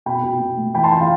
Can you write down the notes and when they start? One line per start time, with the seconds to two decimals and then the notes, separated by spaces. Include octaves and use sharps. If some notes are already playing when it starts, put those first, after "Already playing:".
0.06 B2 G5 B5
0.23 B2
0.40 B2
0.57 A3
0.74 E3 G5 B5
0.84 A5 C6
0.92 E3 G5 B5
1.01 F5 A5